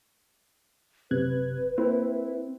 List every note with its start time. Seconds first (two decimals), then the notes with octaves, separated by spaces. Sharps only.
1.11 F#1 C3 B4 F#6 G#6
1.78 A#3 C4 E4